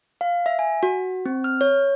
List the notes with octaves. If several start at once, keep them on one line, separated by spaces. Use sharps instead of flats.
F5
E5
G#5
F#4
C4
F6
C#5